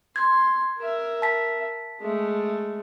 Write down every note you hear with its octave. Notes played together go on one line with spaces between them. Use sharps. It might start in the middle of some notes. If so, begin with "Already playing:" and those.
C6 G#6
A#4 E5
A5 B6
G#3 A3